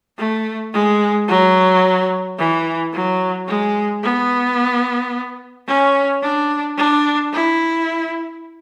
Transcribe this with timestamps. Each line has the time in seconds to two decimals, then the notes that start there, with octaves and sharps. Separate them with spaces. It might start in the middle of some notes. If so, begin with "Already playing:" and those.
0.18 A3
0.73 G#3
1.28 F#3
2.38 E3
2.93 F#3
3.48 G#3
4.03 B3
5.68 C#4
6.23 D4
6.78 D4
7.33 E4